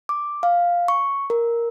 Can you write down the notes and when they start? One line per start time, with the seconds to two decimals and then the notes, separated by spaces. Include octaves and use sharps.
0.09 D6
0.43 F5
0.88 C#6
1.30 A#4